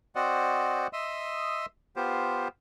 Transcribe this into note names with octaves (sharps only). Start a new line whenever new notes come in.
C4 F#4 C5 D5 D#5 F#5
D#5 E5 C6 D#6 E6
B3 F4 G4 C5